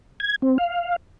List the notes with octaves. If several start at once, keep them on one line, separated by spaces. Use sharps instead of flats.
G#6
C4
F5